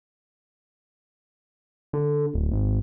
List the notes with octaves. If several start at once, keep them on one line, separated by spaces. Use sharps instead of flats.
D3
D1
G#1